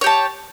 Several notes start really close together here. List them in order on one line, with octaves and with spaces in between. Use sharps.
C#5 G4 A5